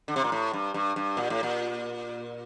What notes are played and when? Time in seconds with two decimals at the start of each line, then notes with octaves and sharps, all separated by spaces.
0.08 D3
0.16 C3
0.24 A#2
0.32 A2
0.53 G2
0.74 G2
0.96 G2
1.17 A#2
1.30 A2
1.43 A#2